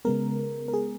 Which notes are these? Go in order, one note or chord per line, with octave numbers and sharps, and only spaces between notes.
C#3 G#3 B3 A#4
A#4
G#4